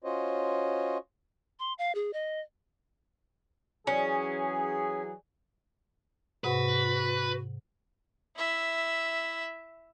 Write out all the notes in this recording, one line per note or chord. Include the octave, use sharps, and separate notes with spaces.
C#4 F4 F#4 C5 C#5 D#5
C6
F5
G#4
D#5
E3 F#3 C#4 G#4
G#2 C3 F#4 B4 F#5
E4 E5